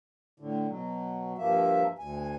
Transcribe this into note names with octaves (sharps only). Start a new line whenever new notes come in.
A2 D3
B2 F#3
G2 F3 A#3 E5
D2 G#5